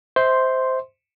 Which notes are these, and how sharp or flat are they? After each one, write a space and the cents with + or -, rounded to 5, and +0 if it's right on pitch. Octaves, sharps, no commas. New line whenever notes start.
C5 -5 E5 -35 C6 +0